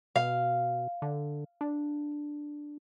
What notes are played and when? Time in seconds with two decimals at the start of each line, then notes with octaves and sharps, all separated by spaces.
0.16 B2 F5
1.02 D3
1.61 D4